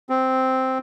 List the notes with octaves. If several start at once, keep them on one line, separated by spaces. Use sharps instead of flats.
C4